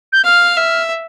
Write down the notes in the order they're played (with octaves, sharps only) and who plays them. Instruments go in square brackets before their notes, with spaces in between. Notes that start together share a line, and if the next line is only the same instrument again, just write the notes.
[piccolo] G6
[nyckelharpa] F5 [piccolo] F6
[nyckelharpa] E5